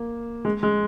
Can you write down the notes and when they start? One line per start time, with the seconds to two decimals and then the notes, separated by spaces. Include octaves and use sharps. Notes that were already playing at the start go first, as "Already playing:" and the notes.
Already playing: A#3
0.45 G#3
0.63 G#3